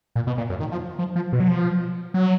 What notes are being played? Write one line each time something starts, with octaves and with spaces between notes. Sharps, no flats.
A#2
B2
A#2
F#2
D#3
F3
F3
F3
B2
F#3
F3
F#3